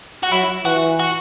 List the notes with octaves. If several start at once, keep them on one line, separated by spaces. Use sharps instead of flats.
F#4
F#3 E4
E3 F#4
F#4